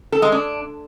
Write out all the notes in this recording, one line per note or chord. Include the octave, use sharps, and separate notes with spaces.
A4
G#3
D4